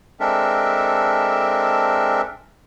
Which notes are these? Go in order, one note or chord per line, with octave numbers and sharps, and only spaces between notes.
G#3 C4 D4 A4 A#4 E5